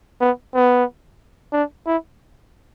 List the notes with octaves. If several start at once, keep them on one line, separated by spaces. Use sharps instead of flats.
B3
B3
D4
E4